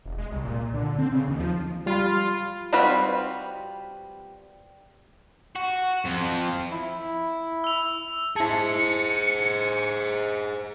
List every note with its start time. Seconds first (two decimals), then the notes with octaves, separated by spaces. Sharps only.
0.05 E1
0.18 G#3
0.32 C2
0.44 A#2
0.74 D3
0.98 C4
1.12 C#3
1.28 D#2
1.40 F3
1.86 G3 F4 B5
2.73 G3 C4 F4 F#4 B4
5.56 F#4
6.05 F2 F3
6.71 E4
7.64 E6 F7
8.36 E4 G#4 C5 A5 C#7